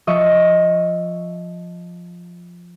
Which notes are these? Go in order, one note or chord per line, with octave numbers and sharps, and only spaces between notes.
F3 D#5 E5 C#6